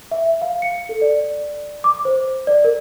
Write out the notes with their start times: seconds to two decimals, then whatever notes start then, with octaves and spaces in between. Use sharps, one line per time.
0.11 E5
0.42 F5
0.62 C#7
0.89 A4
1.02 D5
1.84 D6
2.05 C5
2.47 D5
2.64 A#4